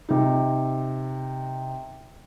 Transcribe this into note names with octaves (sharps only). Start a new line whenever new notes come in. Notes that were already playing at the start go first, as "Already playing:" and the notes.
C3 D#4